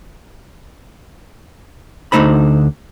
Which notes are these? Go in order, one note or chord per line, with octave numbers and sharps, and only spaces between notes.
D2 D3 A3 D#4 C5 B5